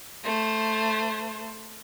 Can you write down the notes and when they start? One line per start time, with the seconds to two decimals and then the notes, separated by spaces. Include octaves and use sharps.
0.24 A3 C5